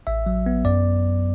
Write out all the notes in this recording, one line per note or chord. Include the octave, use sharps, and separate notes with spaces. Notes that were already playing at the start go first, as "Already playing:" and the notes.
A1 E5
F#3
B3
F#2 D5